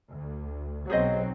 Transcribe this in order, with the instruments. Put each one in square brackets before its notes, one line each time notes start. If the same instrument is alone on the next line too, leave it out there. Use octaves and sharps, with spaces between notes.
[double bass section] D2
[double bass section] B1 F#3 C4 [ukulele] G#4 C5 D#5